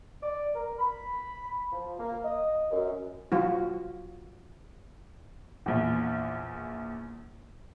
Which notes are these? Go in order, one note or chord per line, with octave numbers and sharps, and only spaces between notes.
D5
A#4
B5
F3
A#3
D#5
F#2
F#3 F4 F#4
A#1 E2